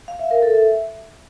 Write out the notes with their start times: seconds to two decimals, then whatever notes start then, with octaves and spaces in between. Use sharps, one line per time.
0.08 F5
0.19 E5
0.31 A#4
0.42 A4
0.54 E5